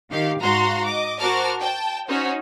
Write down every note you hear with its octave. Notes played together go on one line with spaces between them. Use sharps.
D#3 G4 F5
G#2 F#4 F5 A#5 C6
D#5 D6
F#4 A#4 C5 A5 D6 F6
G5 A5
C#4 D#4 F#4 C5 C#5